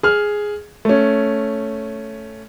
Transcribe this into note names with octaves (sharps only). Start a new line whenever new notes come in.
G#4 F6
A3 C#4